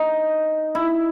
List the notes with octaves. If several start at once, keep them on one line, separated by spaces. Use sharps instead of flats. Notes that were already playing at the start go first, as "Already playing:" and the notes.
Already playing: D#4
E4